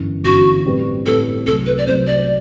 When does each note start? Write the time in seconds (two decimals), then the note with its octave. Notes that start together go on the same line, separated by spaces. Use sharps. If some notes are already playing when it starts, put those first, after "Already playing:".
Already playing: G1 F#2 E3
0.24 G1 F#2 E3 F#4
0.65 A2 G3 C4 G4 B4
1.06 A2 G3 C4 G4 A4 B4
1.46 C2 C3 F#3 A3 A4
1.66 B4
1.78 D5
1.86 C2 C3 F#3 A3 C5
2.06 D5